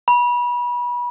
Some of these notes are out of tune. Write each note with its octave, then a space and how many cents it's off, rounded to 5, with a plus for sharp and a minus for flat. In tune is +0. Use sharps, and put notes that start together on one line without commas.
B5 -30